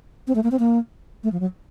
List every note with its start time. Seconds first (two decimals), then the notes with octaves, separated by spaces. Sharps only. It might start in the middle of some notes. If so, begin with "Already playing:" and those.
0.27 C4
0.35 A3
0.43 A#3
0.51 C4
0.59 A#3
1.23 A3
1.32 F3
1.40 F#3